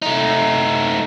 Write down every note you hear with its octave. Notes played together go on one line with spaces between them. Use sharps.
A3 D#4